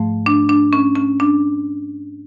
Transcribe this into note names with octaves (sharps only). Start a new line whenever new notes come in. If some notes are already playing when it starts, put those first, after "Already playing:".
Already playing: G#2 F3 A3
D4
D4
C#4
C#4
D4